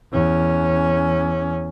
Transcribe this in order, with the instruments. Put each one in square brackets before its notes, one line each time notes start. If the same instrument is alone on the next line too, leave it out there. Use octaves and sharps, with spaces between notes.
[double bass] E2 C#4